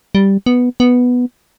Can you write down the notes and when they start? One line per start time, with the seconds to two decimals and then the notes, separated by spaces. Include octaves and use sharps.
0.15 G3
0.46 B3
0.80 B3